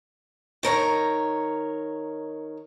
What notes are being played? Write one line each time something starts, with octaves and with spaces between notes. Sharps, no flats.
D#3 A#4 C#5 A#5